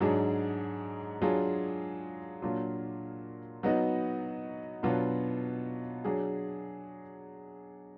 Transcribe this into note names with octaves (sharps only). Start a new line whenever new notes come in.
G#2 F#3 D4 G#4
F#3 D4 F4 G#4
A#2 F#3 D4 F4
F#3 B3 D#4 F#4
B2 F#3 B3 D4 F4
F#3 D4 G#4